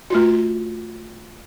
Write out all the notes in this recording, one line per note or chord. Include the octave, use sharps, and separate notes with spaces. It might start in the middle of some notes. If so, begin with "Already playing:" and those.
A3 F4 F#4